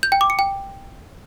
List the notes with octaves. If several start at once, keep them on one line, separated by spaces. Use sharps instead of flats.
G6
G5
D6
C#7
G5